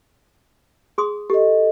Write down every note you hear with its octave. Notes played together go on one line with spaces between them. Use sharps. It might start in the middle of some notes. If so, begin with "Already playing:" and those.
G#4 C6 D#6
G4 A4 D#5